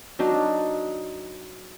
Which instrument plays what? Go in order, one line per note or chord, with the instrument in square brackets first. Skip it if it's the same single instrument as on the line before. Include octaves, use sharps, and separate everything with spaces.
[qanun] F#3 D4 D#4